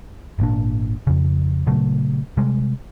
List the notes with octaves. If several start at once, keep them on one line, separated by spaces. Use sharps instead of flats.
G#1 A#2 D4
F2 C#3
A#2 C#3 F#3 A3
C3 G3 G#3